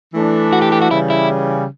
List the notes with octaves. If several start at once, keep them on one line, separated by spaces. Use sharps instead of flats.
E3 A3 D4
F#4
G4
G4
F#4
C#3 E3 G3 E4
E4